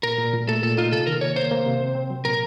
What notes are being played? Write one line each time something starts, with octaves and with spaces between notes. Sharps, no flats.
A#2 A#4
A#2
A#2
A3 A4
A#2 A4
D#4 F4
C3 A4
D#3 A#4
A#3 C#5
A#3 C5
A#3
C3
C4
C4
F#3
A#2 A#4